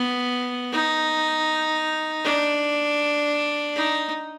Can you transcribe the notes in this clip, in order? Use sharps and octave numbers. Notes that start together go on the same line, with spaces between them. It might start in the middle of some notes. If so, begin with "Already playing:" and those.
Already playing: B3
D#4
D4
D#4